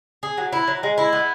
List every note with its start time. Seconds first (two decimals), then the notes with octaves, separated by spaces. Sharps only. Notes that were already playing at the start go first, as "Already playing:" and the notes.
0.23 G#4
0.38 F#3
0.53 E4
0.68 F#3
0.83 G#3
0.98 E4
1.13 B3